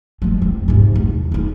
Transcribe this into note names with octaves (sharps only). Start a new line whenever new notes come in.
F3 G#3
E2 C4
G#2 C3
E2
C#3 D#4